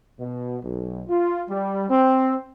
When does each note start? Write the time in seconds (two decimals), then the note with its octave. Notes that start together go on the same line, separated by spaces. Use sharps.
0.19 B2
0.64 B1
1.08 F4
1.49 G3
1.90 C4